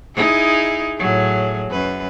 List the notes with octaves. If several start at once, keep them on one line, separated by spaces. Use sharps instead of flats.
D#4 E4 G#4
A2 F#3 G#4
F#2 B4